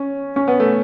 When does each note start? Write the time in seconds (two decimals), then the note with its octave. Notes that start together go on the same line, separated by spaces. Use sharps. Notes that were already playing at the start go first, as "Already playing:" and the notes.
Already playing: C#4
0.36 C#4
0.48 B3
0.60 A3